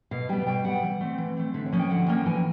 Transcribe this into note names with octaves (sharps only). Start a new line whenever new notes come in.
B2 F5
G3 B3 G5
B2 G5
G3 B3 F#5
E3
A3 C4
E3
A3 C4
D3 E5
C#5
F3 A#3 C#4
G5
D3 F#5
F3 A#3 C#4 G5
E3 G#5